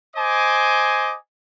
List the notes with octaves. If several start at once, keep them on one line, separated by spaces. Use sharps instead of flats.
C5 D#5 G#5 D6